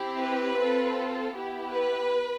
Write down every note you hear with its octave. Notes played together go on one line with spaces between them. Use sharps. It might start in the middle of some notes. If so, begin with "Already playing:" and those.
Already playing: C4 E4 G4
B4
C4 F4 A4
B3 E4 G4
B4